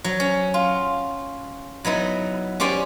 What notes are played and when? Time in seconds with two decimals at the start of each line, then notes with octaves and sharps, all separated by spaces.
0.04 F#3
0.20 C#4
0.54 F4
1.85 F#3 B3 D#4 E4
2.60 C#4 G4 C5 D5 G#5